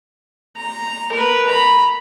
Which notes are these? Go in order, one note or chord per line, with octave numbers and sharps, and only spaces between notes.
A#5
A#4 B4
A#5 B5